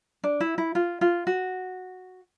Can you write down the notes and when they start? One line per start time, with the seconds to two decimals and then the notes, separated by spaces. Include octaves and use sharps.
0.24 D4
0.40 E4
0.58 E4
0.75 F4
1.01 F4
1.27 F#4